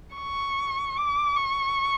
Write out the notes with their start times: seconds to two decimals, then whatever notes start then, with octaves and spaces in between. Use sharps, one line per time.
0.15 C#6
0.97 D6
1.37 C#6